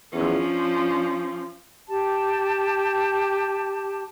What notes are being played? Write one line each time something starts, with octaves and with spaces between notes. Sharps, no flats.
E2 F3 C#4
D4
G4 A5